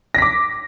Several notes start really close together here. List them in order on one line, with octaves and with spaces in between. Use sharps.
A#6 B6 D6